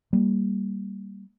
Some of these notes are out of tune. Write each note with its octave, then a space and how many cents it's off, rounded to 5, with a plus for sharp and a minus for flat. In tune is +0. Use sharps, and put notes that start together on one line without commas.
G3 +0 A#3 +0